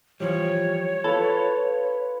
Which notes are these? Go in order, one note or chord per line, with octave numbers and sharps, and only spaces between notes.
E3 F3 G3 C#5
F4 A4 B4